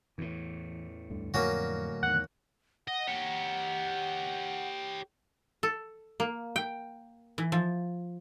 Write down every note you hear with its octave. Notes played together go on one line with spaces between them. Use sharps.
E2 A2 E3
D2 G2 D3
F2 A2 D3 F#3 A#3 C#4 F#4
E2 D#3 F#5
D#5 F#5
G4 C#5
A4
A#3
G5
E3
F3